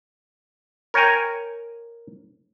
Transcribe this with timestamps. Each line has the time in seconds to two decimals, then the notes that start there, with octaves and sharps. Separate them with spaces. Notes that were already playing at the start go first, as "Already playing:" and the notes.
0.94 A#4 C#5 G5 G#5 A#5